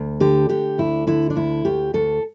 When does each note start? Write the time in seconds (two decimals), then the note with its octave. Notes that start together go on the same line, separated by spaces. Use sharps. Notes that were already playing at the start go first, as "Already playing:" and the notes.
Already playing: D2
0.20 D3 G4
0.49 D3 G4
0.78 D2 E4
1.07 D3 E4
1.30 D4
1.36 D2 E4
1.65 D2 G4
1.94 D2 A4